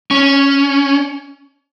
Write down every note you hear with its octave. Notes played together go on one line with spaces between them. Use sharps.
C#4